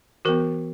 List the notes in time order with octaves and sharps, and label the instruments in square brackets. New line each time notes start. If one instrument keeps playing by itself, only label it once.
[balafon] E3 B3 F#4 A#4